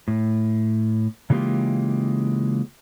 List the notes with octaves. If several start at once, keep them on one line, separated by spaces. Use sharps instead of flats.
A2
C#3 E3 G#3 A#3 F4 G4